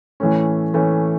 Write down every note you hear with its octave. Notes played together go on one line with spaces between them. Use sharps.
A2 E3 A3 C#4
A2 E3 A3 C#4